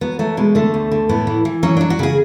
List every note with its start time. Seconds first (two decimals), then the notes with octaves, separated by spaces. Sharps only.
0.01 F#3 B3
0.19 F#3 A3
0.37 B2 G#3
0.55 D3 A3
0.74 D2
0.92 D3
1.09 A2 B3
1.27 E3
1.45 E3
1.63 F#3 C#4
1.77 F#3 D4
1.90 F#4
1.99 C#3 G#4